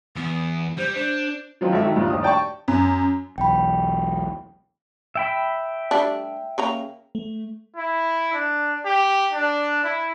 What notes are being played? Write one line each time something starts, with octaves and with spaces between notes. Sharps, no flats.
E2 B3
G3 C5
D4 C5
D#3 F3 F#3 F4
G#1 A4 E5
D#3
C2 G2 A#2
D#2 A2 F3 D#6
D5 G5 A5 C#6
F#2
B1 E2 G5 B5
E5 G5 B5
G3 A3 D4
C#3 A#3 A#5
A3
E4
D4
G4
D4
E4